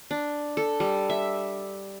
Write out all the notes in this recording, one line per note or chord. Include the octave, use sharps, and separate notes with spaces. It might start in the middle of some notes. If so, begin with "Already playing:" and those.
D4
A4
G3
E5